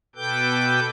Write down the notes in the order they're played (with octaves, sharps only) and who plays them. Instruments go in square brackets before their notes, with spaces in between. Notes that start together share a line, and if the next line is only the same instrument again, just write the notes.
[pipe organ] B2 A4 B4 G5 D6 G6